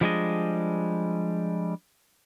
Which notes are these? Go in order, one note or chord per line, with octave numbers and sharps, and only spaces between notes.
F3 G3 G#3 D4 G#4 D#5